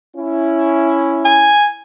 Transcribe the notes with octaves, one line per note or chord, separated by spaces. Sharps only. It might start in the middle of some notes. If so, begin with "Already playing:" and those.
C#4 E4
G#5